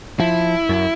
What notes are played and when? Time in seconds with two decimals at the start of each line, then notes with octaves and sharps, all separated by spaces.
0.20 F3 E4
0.69 F#2